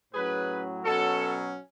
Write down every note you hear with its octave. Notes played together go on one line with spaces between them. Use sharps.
A2 F#3 C#4 G#4 B4
B2 F#3 C#4 F#4 A4